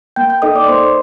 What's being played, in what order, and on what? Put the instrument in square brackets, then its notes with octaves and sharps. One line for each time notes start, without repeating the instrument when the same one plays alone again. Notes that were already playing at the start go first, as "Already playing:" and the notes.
[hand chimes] A#3 G5 G6
G5 G6
D#4 A4 D#5 D#6
D5 D6
A#3 C5 C6